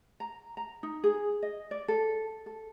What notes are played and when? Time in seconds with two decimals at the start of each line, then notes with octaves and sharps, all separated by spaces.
0.20 A#5
0.57 A#5
0.83 D#4
1.04 G#4
1.43 D#5
1.71 D5
1.88 A4
2.46 A4